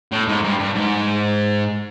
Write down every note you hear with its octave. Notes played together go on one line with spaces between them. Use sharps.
A2
G#2
G2
G2
G#2